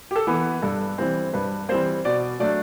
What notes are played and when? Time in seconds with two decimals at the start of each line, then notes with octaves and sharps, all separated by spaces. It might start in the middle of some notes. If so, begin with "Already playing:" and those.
0.11 G4
0.16 A4
0.27 E3 B3
0.62 G2 A4
0.98 E3 G3 C4
1.33 G2 B4
1.69 E3 G3 C4 C5
2.05 B2 D5
2.40 F#3 A3 D4 D5